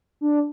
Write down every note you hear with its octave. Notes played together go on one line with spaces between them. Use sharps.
D4